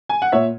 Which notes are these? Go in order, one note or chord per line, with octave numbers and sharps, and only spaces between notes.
G#5
F#5
A#2 C#5 E5